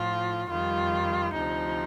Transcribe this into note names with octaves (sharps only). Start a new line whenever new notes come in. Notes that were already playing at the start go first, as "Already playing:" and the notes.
Already playing: A2 F3 F4
F2 D#3 G3 F4
D2 C3 F3 D#4